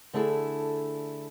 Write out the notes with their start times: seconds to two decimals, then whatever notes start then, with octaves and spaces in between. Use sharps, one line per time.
0.13 D3 A3 D4 E4 G#4 A4